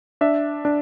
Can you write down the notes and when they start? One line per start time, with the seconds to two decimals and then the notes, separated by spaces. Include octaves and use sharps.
0.21 D4 E5
0.65 D4